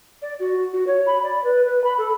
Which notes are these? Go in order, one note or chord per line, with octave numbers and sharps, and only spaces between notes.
D5
F#4
F#4
C#5
B5
D5
B4
B4
B5
A4